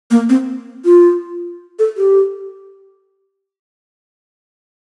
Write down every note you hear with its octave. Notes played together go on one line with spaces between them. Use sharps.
A#3
C4
F4
A4
G4